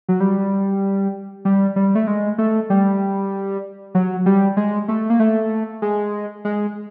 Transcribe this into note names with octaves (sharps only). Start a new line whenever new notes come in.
F#3
G3
G3
G3
A3
G#3
A3
G3
F#3
G3
G#3
A3
A#3
A3
G#3
G#3